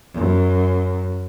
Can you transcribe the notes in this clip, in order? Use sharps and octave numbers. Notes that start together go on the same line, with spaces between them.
F#2